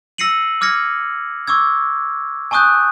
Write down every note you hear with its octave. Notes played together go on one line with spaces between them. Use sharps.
E6 A#6 C7 C#7 D#7 F#7
D6 F6 G#6 A#6 C#7
C#6 D6 E6 G#6
G#5 A5 C#6 D#6 F#6 G6